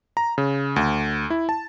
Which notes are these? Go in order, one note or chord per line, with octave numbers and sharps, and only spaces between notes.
A#5
C#3
D2
E4
A5